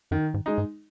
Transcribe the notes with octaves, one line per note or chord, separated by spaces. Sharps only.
F#2 D#3
G#2
G#3 D#4
G#2